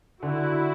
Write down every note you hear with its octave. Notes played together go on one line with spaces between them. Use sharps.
D3 E4 F#4